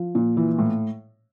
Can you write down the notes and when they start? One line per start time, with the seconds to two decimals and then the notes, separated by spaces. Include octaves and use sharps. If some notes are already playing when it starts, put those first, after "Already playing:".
Already playing: F3
0.15 A#2
0.37 E3
0.59 A2